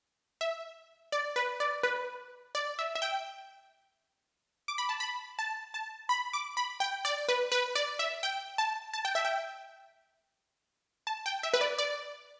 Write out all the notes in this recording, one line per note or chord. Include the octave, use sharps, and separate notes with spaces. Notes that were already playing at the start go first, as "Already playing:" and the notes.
E5
D5
B4
D5
B4
D5
E5
E5
G5
D6
B5
A5
B5
A5
A5
B5
D6
B5
G5
D5
B4
B4
D5
E5
G5
A5
A5
G5
E5
G5
A5
G5
E5
B4
D5
D5